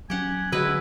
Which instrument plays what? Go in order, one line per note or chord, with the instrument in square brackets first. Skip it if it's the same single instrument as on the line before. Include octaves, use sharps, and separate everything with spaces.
[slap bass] F#3 C#4 [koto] G4 F#5 [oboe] G#5
[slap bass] D3 [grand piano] F#3 G#3 F#4 [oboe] E4 [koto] B4 D#5